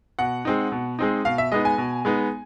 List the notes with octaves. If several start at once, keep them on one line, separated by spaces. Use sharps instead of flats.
B2 F#5
G#3 C4 D#4
B2
G#3 C4 D#4
B2 F5
E5
G#3 B3 D#4 D#5
G#5
B2
G#3 B3 D#4